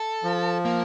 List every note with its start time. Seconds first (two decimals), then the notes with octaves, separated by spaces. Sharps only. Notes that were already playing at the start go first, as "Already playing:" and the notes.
Already playing: A4
0.24 F3
0.65 A#3